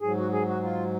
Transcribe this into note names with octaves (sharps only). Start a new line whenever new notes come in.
G#2 F#3 G#4
F#4
G#4
F#4
F4